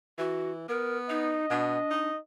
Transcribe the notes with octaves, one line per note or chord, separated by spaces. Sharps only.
E3 F#4
B3 A#4
D#4 D#5
B2 D4
D#4